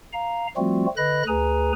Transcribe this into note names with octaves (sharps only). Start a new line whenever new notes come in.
F5 A#5
F3 G3 A3 C4 F4 F#4
D3 B4 D#5 B5 F#6 A#6
D2 G#4 B4 G#5 A#5